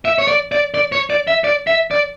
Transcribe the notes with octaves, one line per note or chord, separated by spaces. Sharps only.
E5
C#5
D5
D5
D5
C#5
D5
E5
D5
E5
D5